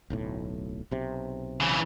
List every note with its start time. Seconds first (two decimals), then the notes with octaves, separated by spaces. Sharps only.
0.10 D1 B1 A2
0.91 B1 C3
1.60 C#3 E3